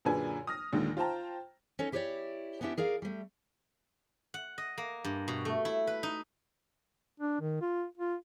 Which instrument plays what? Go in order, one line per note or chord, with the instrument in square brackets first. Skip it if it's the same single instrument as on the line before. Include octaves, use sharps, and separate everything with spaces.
[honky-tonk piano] F#2 A#2 D3 G#4 B4 G#5
D#6 F6 A#6
A#1 D#2 D3 D#3 G#3
F4 C5 G5 A5 A#5
[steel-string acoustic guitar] C#4 D#4 A4 C#5 D#5
E4 G4 G#4 B4 C#5 D5
B3 C#4 D4 E4 G4
G#4 A#4 D5 F5
G3 A3
[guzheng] F#5
D#5
A#3
G2
B2
A3
E4
B4
D#4
[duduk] D4
D#3
F4
F4